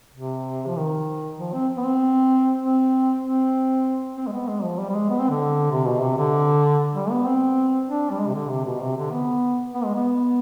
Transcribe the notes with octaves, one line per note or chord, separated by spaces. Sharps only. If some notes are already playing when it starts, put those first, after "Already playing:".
C3
F3
D#3
F3
C4
B3
C4
C4
C4
C4
G#3
B3
G#3
F3
G3
G3
G#3
B3
C4
D3
C3
B2
C3
D3
G3
B3
C4
D4
G3
G#3
C3
D3
C3
B2
C3
D3
B3
B3
G#3
B3